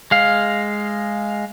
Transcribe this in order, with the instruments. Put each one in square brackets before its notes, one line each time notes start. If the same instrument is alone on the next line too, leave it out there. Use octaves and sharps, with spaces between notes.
[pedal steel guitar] G#3 F5